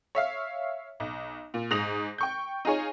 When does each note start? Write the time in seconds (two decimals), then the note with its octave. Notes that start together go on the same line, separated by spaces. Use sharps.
0.15 C#5 E5 F5
1.00 B1
1.54 A#2
1.71 G#2 D#6 A#6 F7
2.18 G5 C#6 G6
2.65 D#4 F4 G#4 C#5